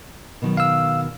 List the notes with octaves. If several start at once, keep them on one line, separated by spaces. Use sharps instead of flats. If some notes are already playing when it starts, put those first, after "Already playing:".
B2 D#3 F#3
F5 E6